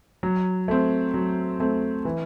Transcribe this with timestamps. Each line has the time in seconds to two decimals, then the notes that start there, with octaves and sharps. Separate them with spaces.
0.23 F#3
0.68 A3 C4
1.14 F#3
1.60 A3 C4
2.05 E3